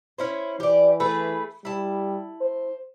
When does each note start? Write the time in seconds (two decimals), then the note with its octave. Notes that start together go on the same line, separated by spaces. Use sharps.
0.18 C#4 E4 C5
0.60 E3 G4 D5
1.00 A3 G#4 B4
1.65 G3 E4 A5
2.41 C5